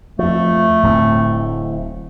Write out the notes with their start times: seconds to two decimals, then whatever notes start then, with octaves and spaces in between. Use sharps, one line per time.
0.19 F2 F3 A3
0.83 D1 A2 C4